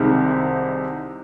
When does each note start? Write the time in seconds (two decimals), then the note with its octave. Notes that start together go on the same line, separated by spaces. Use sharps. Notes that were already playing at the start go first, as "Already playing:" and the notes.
Already playing: C2 C3 D#3 G#3 C4